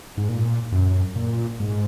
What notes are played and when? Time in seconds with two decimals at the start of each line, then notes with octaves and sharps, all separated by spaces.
0.17 G#2
0.29 A#2
0.72 F#2
1.16 A#2
1.60 G#2